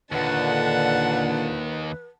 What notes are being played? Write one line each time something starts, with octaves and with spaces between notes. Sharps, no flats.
D#2 A#2 D3 B4 F#5 A5